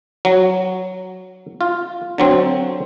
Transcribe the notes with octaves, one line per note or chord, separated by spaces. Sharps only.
F#3
F4
D3 F#3 C4